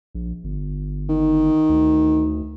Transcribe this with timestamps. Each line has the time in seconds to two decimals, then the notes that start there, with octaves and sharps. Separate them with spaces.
0.15 A#1
0.44 G1
1.09 D#3
1.69 D2